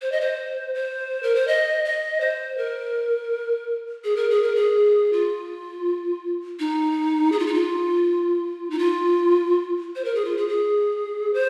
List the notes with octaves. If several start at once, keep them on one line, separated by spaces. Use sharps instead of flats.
C5
D#5
C5
C5
A#4
C5
D#5
D#5
C5
A#4
G#4
A#4
G#4
A#4
G#4
F4
D#4
G#4
F4
D#4
F4
D#4
F4
C5
A#4
G#4
F4
G#4
G#4
C5